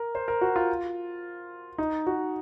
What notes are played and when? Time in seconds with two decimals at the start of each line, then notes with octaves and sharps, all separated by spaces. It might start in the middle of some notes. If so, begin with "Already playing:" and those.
Already playing: A#4
0.15 C5
0.28 A#4
0.41 F#4
0.56 F4
1.78 D#4
2.07 F#4